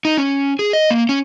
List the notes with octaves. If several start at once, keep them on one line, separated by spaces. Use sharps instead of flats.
D#4
C#4
G#4
D#5
A#3
C#4